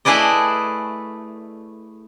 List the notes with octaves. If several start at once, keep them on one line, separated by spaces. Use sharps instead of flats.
A3 E4 G#4 B4 D5 D#5